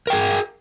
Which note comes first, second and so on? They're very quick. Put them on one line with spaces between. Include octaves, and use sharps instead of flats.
A#4 G5 G#4